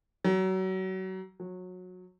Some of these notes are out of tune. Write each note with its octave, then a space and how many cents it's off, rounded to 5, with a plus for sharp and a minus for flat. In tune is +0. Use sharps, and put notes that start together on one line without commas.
F#3 +30
F#3 -20